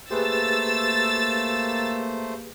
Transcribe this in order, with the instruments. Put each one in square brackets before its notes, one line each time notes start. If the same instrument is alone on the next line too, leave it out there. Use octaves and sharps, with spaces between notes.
[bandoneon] A3 C5 [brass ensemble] A#3 [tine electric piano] G4 G#4 B4 [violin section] E6 A6